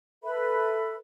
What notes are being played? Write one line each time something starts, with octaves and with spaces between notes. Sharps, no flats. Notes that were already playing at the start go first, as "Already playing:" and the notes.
A4 B4 E5 B5